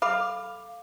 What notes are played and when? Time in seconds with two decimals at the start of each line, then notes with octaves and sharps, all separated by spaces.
0.02 A4 F5 B5 D6